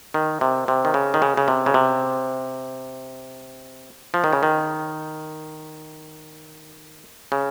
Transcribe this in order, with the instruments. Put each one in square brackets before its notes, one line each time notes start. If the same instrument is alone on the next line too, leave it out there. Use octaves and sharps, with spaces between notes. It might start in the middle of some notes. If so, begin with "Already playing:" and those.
[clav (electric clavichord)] D#3
C3
C3
D#3
C#3
D#3
C#3
C#3
C3
C#3
C3
F3
D#3
C#3
D#3
C#3